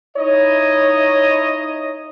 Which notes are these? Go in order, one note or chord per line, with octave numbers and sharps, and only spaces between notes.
D#4 E4 C#5 D#5